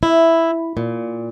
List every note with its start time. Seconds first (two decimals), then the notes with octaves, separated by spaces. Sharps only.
0.03 E4
0.77 A#2